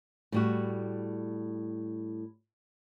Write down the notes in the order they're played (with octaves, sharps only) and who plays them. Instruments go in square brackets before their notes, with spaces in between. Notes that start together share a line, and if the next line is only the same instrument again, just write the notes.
[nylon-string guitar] A2 G3 F#4